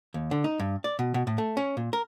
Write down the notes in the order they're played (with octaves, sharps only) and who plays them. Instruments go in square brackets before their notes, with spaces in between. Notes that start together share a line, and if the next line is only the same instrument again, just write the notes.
[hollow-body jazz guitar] D#2
D3
D#4
G2
D5
B2
B2
A2
A3
C#4
A#2
A#4